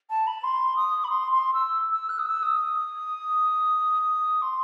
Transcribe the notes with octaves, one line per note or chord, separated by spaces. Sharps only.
A5
B5
C6
D#6
B5
C6
C6
E6
E6
F#6
D#6
E6
D#6
C6